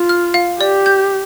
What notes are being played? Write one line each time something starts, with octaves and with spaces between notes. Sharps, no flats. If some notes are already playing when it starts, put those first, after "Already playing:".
Already playing: F4
F6
F5
G4 D5
G6